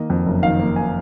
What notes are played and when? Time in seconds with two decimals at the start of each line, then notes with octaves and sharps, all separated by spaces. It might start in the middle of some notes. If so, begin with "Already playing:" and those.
Already playing: D#3 A#3 D#5
0.10 F2
0.26 F#1
0.43 D#3 F5
0.59 A#3
0.76 G#5